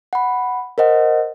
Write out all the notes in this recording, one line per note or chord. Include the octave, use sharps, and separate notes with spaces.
F#5 B5
A#4 C5 D#5 F#5